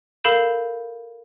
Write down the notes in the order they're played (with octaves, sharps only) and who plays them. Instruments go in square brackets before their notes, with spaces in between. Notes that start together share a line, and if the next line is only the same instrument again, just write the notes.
[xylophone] A4 A#4 F5 B5 G6 E7